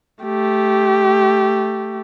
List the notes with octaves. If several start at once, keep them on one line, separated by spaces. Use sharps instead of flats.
A3 G4